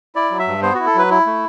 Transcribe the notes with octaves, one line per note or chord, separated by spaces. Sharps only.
E4 D5
F#3
E5
G2
B3 C5
E4 F#4
A4
F#3 B4
E4
A3